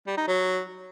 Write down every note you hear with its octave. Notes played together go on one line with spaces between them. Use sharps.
G3
D#4
F#3